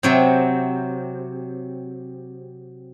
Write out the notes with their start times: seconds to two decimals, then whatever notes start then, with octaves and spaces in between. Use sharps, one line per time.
0.03 C3 F#3 C4